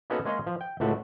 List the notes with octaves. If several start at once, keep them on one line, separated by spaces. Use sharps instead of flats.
A#3 B3 C#4 D#4 F#4 A4
G#3 A#3 C#4 G#4 C#5 D#5
F3
G5
C#2 A2 A3 F#4